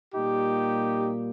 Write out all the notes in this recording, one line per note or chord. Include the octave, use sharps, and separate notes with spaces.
A#2 G3 A#3 D#4 G4